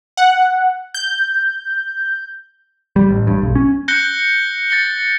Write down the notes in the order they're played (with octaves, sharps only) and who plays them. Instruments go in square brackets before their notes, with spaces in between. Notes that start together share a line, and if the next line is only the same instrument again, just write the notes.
[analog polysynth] F#5
G6
[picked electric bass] G3
A1
G2
B1
C#4
[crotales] F#6 G6 A#6 C#7 G7
A6 A#6 C#7 G7